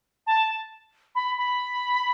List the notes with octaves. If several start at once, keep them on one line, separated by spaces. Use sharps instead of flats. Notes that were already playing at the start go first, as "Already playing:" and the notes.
A5
B5
B5